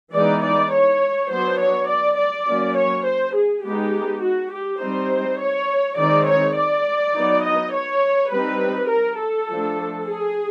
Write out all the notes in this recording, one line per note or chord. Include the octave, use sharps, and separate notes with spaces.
E3 G#3 B3 D#4 D5
D5
C#5
F#3 B3 D4 C5
C#5
D5
D5
F#3 A#3 C#4
C#5
C5
G#4
G#3 B3 D#4 G4
F#4
G4
G3 C4 D#4 C5
C#5
D#3 G#3 C4 D#4 D5
C#5
D5
F#3 B3 D#4
D#5
C#5
G3 C4 D#4 B4
A#4
A4
F3 A3 D4
G#4